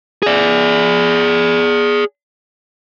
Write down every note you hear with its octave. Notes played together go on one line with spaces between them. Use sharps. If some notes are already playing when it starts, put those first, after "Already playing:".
G#4 D5